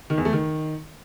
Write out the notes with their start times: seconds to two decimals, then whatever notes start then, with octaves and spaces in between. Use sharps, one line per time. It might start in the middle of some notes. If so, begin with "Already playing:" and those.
0.10 D#3
0.18 E2
0.25 A3
0.33 D#3